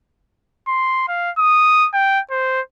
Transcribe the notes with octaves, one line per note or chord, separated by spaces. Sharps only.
C6
F5
D#6
G5
C5